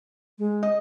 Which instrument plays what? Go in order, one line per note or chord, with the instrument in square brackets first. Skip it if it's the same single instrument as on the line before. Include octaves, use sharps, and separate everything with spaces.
[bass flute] G#3
[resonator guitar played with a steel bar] D#5